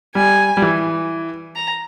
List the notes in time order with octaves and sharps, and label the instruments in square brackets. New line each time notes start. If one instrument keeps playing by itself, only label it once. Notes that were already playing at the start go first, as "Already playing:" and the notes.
[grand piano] G3 [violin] G#5
[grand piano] G3
E3
[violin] A#5